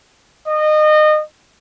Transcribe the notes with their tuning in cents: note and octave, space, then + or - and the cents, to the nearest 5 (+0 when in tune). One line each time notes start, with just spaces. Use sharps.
D#5 -25